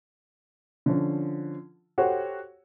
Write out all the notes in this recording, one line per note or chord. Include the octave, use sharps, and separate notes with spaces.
D3 F3 C#4
F#4 G4 A4 C5 C#5 F#5